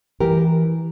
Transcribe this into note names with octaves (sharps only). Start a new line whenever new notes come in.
E3 G4 A#4